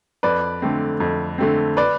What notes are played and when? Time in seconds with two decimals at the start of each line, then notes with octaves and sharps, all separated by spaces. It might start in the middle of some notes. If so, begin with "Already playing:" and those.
0.23 F2 B4 D5
0.62 D3 A3 C4
1.00 F2
1.38 D3 A3 C4
1.77 B4 D5